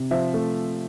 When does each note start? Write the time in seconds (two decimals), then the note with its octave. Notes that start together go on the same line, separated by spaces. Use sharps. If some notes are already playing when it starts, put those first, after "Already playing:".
Already playing: C3
0.11 F3 C5 E5
0.34 A3